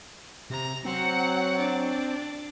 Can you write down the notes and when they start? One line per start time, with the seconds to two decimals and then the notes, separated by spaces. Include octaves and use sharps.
0.50 C3 A#5
0.85 F#3 C4 F#5
1.58 D4